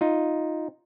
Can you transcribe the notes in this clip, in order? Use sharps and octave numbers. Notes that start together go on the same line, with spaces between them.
D#4 F4